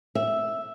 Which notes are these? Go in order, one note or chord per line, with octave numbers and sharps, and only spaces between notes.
E5